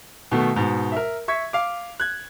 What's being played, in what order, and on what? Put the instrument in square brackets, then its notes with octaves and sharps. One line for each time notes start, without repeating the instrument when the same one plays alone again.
[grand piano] B2 D#3 A3 B3
G#2 B2
A#4 E5
E5 C#6 G#6 B6
F5 D6
F#6 G#6